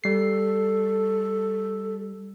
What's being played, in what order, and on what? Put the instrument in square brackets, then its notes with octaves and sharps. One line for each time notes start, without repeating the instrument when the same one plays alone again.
[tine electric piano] G3 C7 [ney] A4